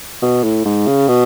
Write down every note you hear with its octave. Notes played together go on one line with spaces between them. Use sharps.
B2
A2
G#2
C#3
B2